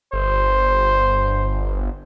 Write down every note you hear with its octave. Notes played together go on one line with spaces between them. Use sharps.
G1 C5